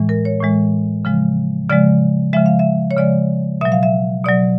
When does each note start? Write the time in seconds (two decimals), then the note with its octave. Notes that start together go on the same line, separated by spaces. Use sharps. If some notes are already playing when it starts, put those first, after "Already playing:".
Already playing: A2 E3 G#3
0.09 A#4
0.25 C#5
0.41 A2 E3 G#3
1.05 C#3 F3 G#3
1.69 C#3 F3 G#3 D5
2.33 C#3 F3 G#3 E5
2.46 F5
2.59 E5
2.91 C#5
2.97 C#3 F3 G#3 D5
3.61 B2 F#3 E5
3.72 F5
3.83 E5
4.25 B2 F#3 D5